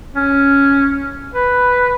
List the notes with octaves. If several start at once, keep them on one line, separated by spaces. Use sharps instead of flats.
C#4
B4